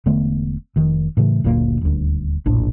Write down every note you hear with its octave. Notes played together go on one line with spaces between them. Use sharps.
E1 D3 A3 B3
F1 D#3
A2 C#3 E3 A3
F#1 D2 A#2 A#3
D#1 D2
F1 A#1 A2 D4